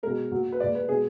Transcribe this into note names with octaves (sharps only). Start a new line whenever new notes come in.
B2 G#3 A#4
A#2 F#3
B4
A#2 G#3 D5
B4
B2 G#3 G#4